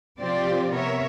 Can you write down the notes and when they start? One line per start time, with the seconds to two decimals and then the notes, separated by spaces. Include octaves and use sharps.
0.19 C3 F3 C4 F4 G4 D5
0.72 C3 B3 A#4 C#5 E5